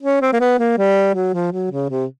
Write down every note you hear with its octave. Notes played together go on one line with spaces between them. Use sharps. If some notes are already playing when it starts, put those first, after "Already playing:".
C#4
C4
A#3
B3
A#3
G3
F#3
F3
F#3
C#3
C3